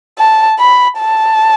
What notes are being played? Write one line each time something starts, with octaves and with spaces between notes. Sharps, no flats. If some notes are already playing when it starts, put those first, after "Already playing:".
A5
B5
A5